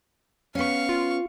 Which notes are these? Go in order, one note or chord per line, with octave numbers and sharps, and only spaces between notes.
B3 C#4 F5 C#6
F4